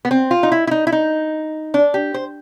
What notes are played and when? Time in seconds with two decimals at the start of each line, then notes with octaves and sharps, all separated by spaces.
0.05 B3
0.11 C4
0.31 F4
0.43 D#4
0.52 E4
0.67 E4
0.71 D#4
0.87 E4
0.92 D#4
1.74 D4
1.94 G4
2.14 C5